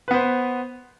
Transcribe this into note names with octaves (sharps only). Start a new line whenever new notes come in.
B3 B4 C5